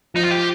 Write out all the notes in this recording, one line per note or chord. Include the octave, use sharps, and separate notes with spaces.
F3 D#4
F4
G4